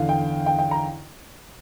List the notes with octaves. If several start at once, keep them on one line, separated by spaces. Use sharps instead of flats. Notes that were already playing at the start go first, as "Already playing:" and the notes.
Already playing: E2 D3 F5
G5
G5
G5
A#5